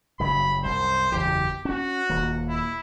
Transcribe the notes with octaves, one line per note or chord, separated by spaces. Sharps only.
F#1 G2 C#3 B5
C2 F#2 C5
F#1 E2 E3 G4
C#4 F#4
D#1 D#2 A#3
E4